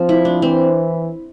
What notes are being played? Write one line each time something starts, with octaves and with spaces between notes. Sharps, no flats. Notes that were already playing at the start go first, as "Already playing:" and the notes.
Already playing: F3 C4
E4
D4
E3 C4